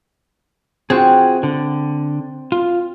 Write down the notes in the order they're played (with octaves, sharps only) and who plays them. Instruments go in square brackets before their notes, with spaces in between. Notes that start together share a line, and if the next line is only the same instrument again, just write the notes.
[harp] C4 [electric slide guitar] F4 F#4 G#4
[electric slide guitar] D3
F4